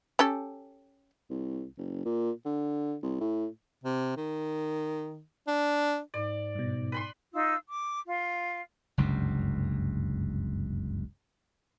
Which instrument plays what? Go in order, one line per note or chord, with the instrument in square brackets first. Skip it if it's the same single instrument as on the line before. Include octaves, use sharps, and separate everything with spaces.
[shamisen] C#4 G4 A4
[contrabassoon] C2
F#1
A#2
D3
C2
A2
[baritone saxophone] C3
D#3
D4
[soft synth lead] G#2 [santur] D5
[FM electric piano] G2 B2
[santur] B4 B5 C6
[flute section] D#4 F4 E6
D6
F4
[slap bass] F#1 C#2 G2 C3